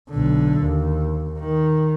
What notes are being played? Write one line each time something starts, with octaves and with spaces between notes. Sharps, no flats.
B1 D3
D#2
D#3